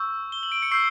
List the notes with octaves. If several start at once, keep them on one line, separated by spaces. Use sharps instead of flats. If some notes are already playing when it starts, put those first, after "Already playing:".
Already playing: C#6 E6 G6
G7
F#7
D7
C#7
C#6 E6 G6 C7